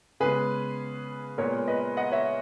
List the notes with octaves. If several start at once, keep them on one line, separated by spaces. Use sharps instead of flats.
C#3 G#3 B3 G#4 B4
A#2 G#3 B3 A#4 C#5
B4 D#5
D#5 F#5
C#5 E5